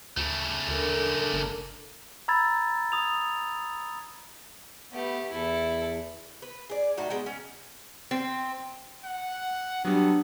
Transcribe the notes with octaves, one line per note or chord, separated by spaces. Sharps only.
D2 C#3 A3
D2 D3 A#4
G1
A#5 B5 E6 G#6 A6
D#6 G#6 F7
A3 B3 G4
E2 E4 A4
B4
G#4 D5
A2 D#4 F#4
G#3 B3 G5
C#4
C4
F#5
F#3 G3 B3 D4